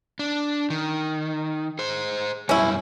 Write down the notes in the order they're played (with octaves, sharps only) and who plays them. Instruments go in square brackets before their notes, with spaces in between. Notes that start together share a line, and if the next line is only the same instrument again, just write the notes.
[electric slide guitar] D4
D#3
G#4 C5
[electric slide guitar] F#2 B2 G3 [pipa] C#4 E4